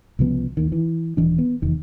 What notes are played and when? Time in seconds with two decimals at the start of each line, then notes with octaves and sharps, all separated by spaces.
0.19 C2 C#3 F3 B3
0.57 D#2 D#3
0.72 E3
1.17 D#1 E3 D4
1.38 B3
1.62 F1 E2 D#3